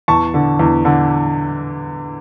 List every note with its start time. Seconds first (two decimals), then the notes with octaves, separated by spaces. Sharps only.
0.08 E2 A5 C#6
0.34 D3
0.59 E2
0.85 D3